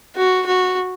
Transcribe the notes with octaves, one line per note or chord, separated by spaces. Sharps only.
F#4
F#4